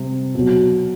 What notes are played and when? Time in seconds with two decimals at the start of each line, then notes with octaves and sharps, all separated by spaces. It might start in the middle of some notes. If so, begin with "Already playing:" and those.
Already playing: C3 G3
0.35 B2 F#3